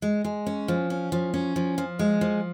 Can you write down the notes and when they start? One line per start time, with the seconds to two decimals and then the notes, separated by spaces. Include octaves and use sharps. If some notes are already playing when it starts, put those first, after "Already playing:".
0.02 G#3
0.24 G#3
0.47 C#4
0.68 F3
0.90 C#4
1.12 F3
1.34 C#4
1.56 F3
1.78 F3
1.99 G#3
2.21 F3